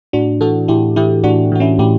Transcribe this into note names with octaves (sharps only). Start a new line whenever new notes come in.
A2 D4 F#4
E3 F#4 A4
A2 E4 G4
E3 E4 G4
A2 D4 F#4
E3 F#4
C#4 E4
A2 E4 G4